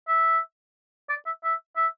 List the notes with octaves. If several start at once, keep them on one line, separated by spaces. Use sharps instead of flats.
E5
D5
E5
E5
E5